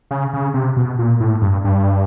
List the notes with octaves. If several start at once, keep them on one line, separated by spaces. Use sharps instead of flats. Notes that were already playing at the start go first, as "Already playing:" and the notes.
C#3
C#3
C3
B2
A#2
A2
G2
G2